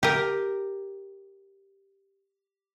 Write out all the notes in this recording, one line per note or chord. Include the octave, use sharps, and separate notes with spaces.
G4 A#4